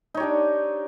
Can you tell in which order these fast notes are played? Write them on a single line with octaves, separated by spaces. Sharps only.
D#4 C#5 G4 D4